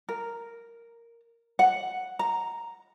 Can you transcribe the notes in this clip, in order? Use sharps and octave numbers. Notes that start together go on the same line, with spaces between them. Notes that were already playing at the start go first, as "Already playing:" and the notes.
A#4
F#5
A#5